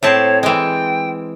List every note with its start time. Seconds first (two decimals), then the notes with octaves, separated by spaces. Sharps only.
0.03 A2 C4 C#5 A5
0.43 E3 G#3 G5